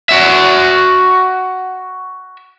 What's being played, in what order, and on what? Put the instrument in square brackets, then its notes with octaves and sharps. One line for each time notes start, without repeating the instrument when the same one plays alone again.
[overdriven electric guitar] F#4 E5